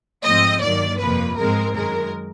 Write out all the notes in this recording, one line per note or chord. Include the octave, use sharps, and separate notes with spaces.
G#2 F3 A3 C4 D#5
G2 D#3 F#3 A#3 D5
F2 C3 F3 A#3 B4
G#2 F3 G#3 C4 A#4
F#2 D#3 G#3 A#4